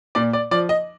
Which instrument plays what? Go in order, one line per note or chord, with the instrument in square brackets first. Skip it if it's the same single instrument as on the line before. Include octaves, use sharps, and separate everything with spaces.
[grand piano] A#2 D5
D5
F3 D5
D#5